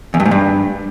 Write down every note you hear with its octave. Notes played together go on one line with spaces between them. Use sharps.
E2
G2
G#2
G2